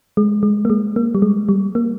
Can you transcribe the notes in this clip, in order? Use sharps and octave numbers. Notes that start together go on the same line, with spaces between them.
G#3
G#3
A#3
G#3
A#3
G3
G#3
G3
A#3